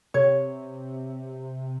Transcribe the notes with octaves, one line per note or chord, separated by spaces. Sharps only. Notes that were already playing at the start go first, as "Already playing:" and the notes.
C3 C#5